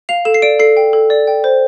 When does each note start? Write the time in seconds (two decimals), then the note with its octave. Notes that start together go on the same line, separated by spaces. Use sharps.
0.09 F5 F7
0.25 A4 E7
0.34 C7
0.42 D5 D7
0.59 A4 C7
0.77 G5
0.93 A4
1.10 D5
1.27 G5
1.44 C5